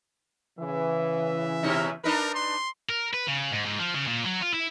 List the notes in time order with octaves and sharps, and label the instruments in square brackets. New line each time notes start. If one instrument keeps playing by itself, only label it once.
[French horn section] C#3 E3 [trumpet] E5
[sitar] B2 C#4 D#4
[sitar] D4 D#4 B4 [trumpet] A#4
[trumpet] C6
[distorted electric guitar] A#4
B4
C#3
G#2
G#2
F3
C#3
A#2
F#3
F4
E4